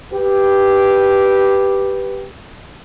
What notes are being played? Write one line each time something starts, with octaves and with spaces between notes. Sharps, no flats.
G4 B4